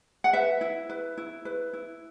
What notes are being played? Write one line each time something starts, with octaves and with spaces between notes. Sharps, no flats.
F#5
B4 E5
E4
B4
E4
B4
E4